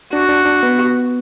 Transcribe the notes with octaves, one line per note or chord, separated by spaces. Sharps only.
D4 F#4
D4
D4
B3